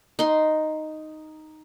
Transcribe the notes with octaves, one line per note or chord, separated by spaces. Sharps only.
D#4 C6